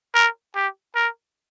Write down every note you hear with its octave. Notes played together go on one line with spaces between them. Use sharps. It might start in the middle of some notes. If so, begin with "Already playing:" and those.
A#4
G4
A#4